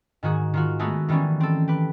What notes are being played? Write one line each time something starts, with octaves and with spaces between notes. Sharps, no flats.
G#2 D#3 F#4 G#4
D#3 F4 F#4
G#3 A3 B3 D#4 F#4
D#3 E3 G3 B3 C#4
C4 A4
G4 B4